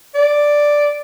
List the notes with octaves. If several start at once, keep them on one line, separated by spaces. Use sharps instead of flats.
D5